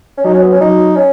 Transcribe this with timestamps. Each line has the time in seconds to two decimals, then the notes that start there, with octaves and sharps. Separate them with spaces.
0.17 C#4
0.24 F#3 D#4
0.34 C#4
0.42 B3
0.52 C#4
0.60 F#3 D#4
0.96 C#4